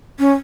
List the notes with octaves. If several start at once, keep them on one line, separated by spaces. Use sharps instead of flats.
C#4